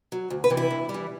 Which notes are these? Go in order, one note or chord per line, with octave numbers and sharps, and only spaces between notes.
F#3
D2
B4
C3 E3
E4
G2
G3
E3